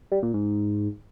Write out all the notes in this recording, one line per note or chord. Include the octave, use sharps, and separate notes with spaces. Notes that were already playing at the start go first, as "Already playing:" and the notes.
G3
A#2
G#2